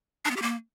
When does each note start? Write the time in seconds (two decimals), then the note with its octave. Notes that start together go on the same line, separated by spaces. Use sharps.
0.25 D4
0.31 B3
0.36 G4
0.42 A#3